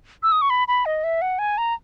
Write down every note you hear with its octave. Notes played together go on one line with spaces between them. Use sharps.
E6
D#6
C#6
B5
B5
D#5
E5
F#5
G#5
A#5